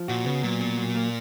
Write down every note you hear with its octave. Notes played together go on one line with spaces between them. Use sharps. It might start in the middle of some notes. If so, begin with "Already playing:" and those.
Already playing: F3
A#2 F#4
C#3 B3
A#2 F#3
B2
F#3
A#3